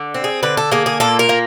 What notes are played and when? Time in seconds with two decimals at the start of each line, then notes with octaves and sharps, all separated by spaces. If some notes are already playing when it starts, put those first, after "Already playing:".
Already playing: D3
0.14 C4
0.24 G#4
0.43 D3 B4
0.57 A4
0.72 A#3 G#4
0.86 G#4
1.00 A#2 A4
1.19 A#4
1.29 A#3